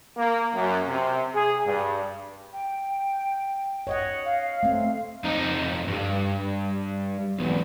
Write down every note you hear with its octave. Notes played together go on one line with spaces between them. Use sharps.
A#3
F#2
C3
G#4
G2
G5
C#5 D#5 F#5
F5
A3 C4
F2 D#4
G2
B1 E2